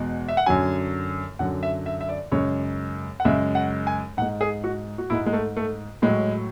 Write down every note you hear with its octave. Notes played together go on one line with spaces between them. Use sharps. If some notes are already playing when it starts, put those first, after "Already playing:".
Already playing: E2 B2 G#3
E5
F#5
F#2 D3 F#3 G#5
F#2 D3 F#3 F#5
E5
E5
E5
D5
F#2 C#3 G#3 C#5
F#5
F#2 C#3 G#3 E5
F#5
G#5
G#2 G#3 F#5
G#4
F#4
F#4
G#2 G#3 E4
G#3
A3
A3
A2 F#3 G#3